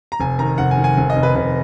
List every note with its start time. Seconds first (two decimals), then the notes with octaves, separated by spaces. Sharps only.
0.12 A#5
0.20 F1 G#5
0.39 D#3 A#5
0.58 F1 F#5
0.71 G#5
0.78 D#3
0.84 G#5
0.97 F1 G#5
1.10 D#5
1.16 F1
1.23 B4
1.35 F1 B4